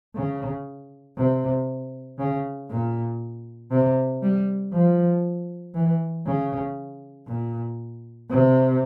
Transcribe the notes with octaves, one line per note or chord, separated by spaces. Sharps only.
C#3
C3
C#3
A#2
C3
G3
F3
E3
C#3
A#2
C3